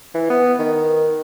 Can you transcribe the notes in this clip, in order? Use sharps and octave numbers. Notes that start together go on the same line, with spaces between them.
E3
B3
D#3